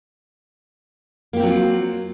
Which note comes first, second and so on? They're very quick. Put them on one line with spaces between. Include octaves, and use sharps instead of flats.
A#3 G4 C4 F#3 F4